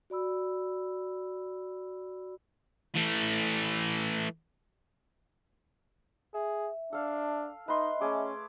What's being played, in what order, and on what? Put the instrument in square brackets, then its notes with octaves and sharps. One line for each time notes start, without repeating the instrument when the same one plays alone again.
[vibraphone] F#4 D5 B5 E6
[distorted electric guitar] E3 A3
[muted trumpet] G#4 [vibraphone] E5
[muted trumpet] D4 [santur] A4 F5
[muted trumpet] D#4 [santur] B4 C6 [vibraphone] D#5 E5
[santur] A3 G#4 D6 [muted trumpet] C#4